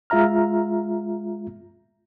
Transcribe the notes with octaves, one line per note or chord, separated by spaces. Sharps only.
G#3 F4 E5 A#5 F6